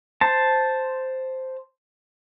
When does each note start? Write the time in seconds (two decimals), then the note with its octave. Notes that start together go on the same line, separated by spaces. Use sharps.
0.21 C5 A5